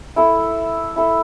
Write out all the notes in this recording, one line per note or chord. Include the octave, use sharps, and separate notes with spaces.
E4 A4 E5
E4 A4 E5